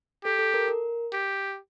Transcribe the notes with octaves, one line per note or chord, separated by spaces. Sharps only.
G4 A4
A4
A#4
A#4
G4